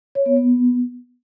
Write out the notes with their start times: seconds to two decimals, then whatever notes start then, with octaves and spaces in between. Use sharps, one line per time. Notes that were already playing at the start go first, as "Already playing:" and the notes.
0.15 C#5
0.26 B3
0.36 B3